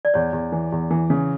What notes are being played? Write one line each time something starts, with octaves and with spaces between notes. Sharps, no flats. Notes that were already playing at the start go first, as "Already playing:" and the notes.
D5
E2 C#5
E2
E3
E2
E3
C#3